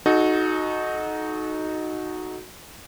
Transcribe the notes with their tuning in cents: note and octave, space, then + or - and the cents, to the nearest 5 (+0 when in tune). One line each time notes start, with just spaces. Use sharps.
D#4 +0 F#4 -10 A4 -35